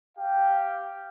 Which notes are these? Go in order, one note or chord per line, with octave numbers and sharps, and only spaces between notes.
G4 F5 G5